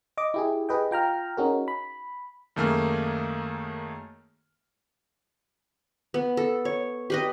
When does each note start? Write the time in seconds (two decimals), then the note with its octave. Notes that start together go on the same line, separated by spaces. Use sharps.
0.17 D#5 D6
0.34 E4 G4 G#4
0.69 G4 G#4 B4 D#5 G5
0.91 F4 G5 A#5 F6
1.37 C#4 D#4 F#4 G#4 A#4
1.68 B5
2.56 F#2 D#3 A3 A#3 G#4 F6
6.14 B3
6.37 A4
6.65 C#5
7.10 G4 B4 D#5